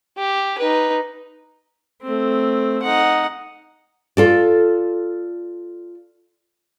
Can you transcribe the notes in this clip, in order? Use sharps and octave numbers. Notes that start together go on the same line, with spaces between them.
G4
D#4 B4
A3 C4
D#4 F#5
F4 A4 D5